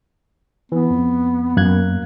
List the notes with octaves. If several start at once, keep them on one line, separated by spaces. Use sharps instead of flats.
E3 B3
F2
F#2 A#3 F#6 G#6